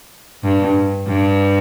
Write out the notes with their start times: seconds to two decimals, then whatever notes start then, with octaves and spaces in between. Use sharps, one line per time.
0.43 G2
1.08 G2